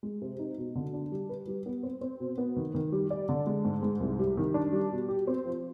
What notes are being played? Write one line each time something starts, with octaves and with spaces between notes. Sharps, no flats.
G#3
C3
D#4
B2
D3
D4
G3
B4
G3
B3
C4
C4
B2
B3
D#3
D#3
G3
D5
D3
G#3
G#2
G#2
C2
G3
D#3
D4
G3
B2
G4
C4
F3